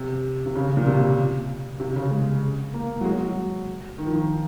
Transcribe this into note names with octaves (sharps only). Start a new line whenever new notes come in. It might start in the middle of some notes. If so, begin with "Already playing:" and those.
Already playing: C3
C3
C#3
A#2
C3
C3
C#3
G#3
A#3
F#3
G#3
F#3
D#3
F3
D#3